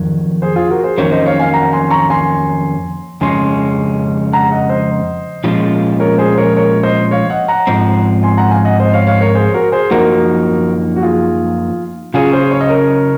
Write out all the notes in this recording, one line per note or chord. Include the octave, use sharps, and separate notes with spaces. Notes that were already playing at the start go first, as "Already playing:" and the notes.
Already playing: F2 D#3 F#3
G#4 C5
F4 G#4
F#4 A#4
G#4 C5
F2 D#3 F#3 A#3 C#4 A#4 C#5
C5 D#5
C#5 F5
F5 G#5
F#5 A#5
G#5 C6
A#5 C#6
G#5 C6
F2 C#3 G#3 C#4 G#5 C6
F#5 A#5
D#5 F#5
C5 D#5
A#2 F3 G#3 C#4 F4
A#4 C#5
G#4 C5
A#4 C#5
A#4 C#5
C5 D#5
C#5 F5
D#5 F#5
F#5 A#5
G#2 F3 C4
G#5 C6
F#5 A#5
F5 G#5
D#5 F#5
C5 D#5
C#5 F5
C#5 F5
A#4 C#5
G#4 C5
F#4 A#4
G#4 C5
F#2 F3 A#3 D#4 F#4 A#4
F#4
F4 G#4
C#3 F#3 C#4 F4 G#4
G#4 C5
C#5
D#5
A#4 C#5